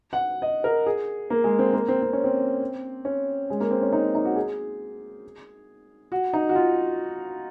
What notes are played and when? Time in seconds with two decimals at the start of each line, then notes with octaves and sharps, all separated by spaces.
0.13 F#5
0.42 D#5
0.64 A#4
0.86 G#4
1.30 A#3
1.44 G#3
1.59 C4
1.73 A#3
1.88 C4
2.02 C4
2.13 C#4
2.24 C4
3.05 C#4
3.50 G#3
3.60 A#3
3.71 C4
3.82 C#4
3.92 D#4
4.04 C#4
4.15 D#4
4.25 F#4
4.36 G#4
6.12 F#4
6.33 D#4
6.49 F#4
6.55 F4